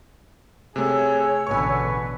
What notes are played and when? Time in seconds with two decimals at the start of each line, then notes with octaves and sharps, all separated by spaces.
0.76 C3 A3 G#4 C#5 E6
1.47 A1 B2 D3 B4 G#5 C#6